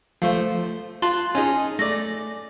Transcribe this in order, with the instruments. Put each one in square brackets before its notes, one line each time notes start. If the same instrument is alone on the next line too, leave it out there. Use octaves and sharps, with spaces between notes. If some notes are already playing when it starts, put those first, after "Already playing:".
[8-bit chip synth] F3 A3 C5 [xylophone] F5
[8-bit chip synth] F4 A5 F#6 [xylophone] C6
[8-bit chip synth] C#4 D#4 G#4 [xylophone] G#5
[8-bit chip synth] A3 D5 [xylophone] A#6